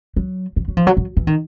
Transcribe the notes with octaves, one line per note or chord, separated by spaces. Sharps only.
F#3
F3
F#3
F3
F#3
F#3
E3
D#3